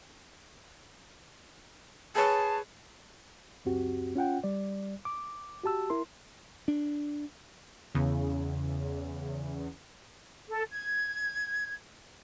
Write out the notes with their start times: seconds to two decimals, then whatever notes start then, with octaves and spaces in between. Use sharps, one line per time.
2.15 G#4 B4 C#5 A5
3.65 C#2 F#2 C4 F#4 G4
4.15 C#4 F4 F#5 G5
4.44 G3 D5
5.05 D6
5.63 F#4 G4 A5 E6
5.90 E4 A#4 C6
6.68 D4
7.95 E2 C#3
10.48 A4
10.72 G#6